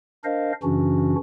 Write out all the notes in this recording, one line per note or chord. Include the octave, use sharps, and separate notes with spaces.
D4 A#4 C5 D#5 F5
F#2 C#3 E3 C#4 D4 F#4